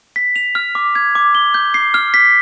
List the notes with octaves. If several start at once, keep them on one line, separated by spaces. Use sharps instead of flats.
B6
F7
F6
D6
G#6
D6
G7
G6
C7
F6
B6